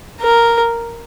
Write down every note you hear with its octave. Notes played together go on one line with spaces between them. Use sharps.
A#4